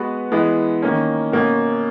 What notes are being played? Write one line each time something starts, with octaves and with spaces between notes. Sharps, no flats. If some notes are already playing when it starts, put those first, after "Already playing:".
Already playing: G#3 B3 F#4 B4
E3 G#3 B3
D#3 A#3 C#4
B2 A#3 C#4